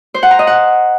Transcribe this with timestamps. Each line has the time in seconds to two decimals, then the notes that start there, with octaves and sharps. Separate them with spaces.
0.14 C5
0.23 F#5
0.31 A#5
0.39 D#5
0.47 F#5